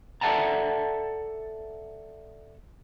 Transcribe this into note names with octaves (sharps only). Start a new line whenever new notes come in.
A4 D5 E5 F#5 A5 A#5